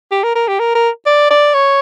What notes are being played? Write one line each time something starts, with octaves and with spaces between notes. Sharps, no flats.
G4
A#4
A#4
G4
A#4
A#4
D5
D5
C#5